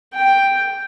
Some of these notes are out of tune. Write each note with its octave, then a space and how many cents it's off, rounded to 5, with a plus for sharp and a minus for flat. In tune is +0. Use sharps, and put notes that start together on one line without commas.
G5 +5